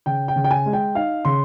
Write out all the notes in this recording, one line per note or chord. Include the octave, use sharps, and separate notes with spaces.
C#3 G5
G5
C#3
G5
G#5
G#3
G5
D#4 F5
C#3 C6